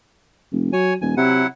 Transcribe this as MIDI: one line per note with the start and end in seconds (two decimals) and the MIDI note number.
0.52 0.70 29
0.73 0.95 54
0.73 0.94 73
0.73 0.94 80
1.01 1.14 27
1.01 1.14 80
1.17 1.44 48
1.17 1.47 54
1.17 1.47 64
1.17 1.47 78